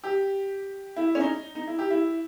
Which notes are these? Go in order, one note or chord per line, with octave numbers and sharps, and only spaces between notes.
G4
E4
C#4
D#4
D#4
E4
G4
E4